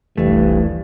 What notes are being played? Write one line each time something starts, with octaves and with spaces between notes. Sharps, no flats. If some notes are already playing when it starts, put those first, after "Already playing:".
F1 C2 G2 E3 A3